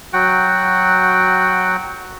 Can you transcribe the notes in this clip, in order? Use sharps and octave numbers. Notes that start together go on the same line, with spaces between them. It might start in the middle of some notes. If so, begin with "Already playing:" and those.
F#3 F#4 F#5 G5